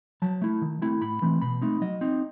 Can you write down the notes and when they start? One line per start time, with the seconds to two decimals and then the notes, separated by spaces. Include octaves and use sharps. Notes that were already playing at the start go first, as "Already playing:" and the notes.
0.22 F#3 A5
0.42 A3 E4
0.62 D#3
0.82 A3 C4 E4
1.01 A2 B5
1.22 E3 A3 C4
1.42 B2 B5
1.62 A3 C4 D#4
1.81 F#3 D#5
2.01 C4 D#4